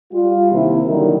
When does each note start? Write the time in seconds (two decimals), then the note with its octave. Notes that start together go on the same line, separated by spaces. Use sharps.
0.12 G3 F4
0.52 D#2 C3 E4
0.87 D3 D#3 F#3 G3 D#4 A#4